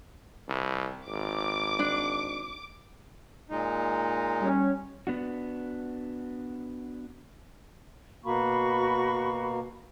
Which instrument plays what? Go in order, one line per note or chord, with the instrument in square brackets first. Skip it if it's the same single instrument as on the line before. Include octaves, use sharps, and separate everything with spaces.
[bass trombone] C2
[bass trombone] G#1 [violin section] D6
[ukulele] D4
[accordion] A#2 G#3 D#4
[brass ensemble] G3 C#4
[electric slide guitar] B3 D4 F#4
[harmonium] B2 A#3 [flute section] F#4 B5 C#6